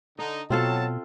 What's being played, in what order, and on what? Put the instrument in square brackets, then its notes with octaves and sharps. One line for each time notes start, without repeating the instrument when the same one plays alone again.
[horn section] D3 D#4 [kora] D#5
[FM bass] B2 [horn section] F#3 A5 [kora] C4 F4 A4